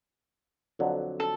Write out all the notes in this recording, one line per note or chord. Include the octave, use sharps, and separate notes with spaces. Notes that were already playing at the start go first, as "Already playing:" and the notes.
F2 D3 F#3
A4